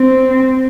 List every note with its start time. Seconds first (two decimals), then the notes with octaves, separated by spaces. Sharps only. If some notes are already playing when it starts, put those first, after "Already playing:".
Already playing: C4